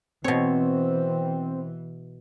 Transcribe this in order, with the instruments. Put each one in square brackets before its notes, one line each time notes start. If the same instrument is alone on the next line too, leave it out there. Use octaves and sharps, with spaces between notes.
[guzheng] B2 C#5 [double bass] E3 [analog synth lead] C4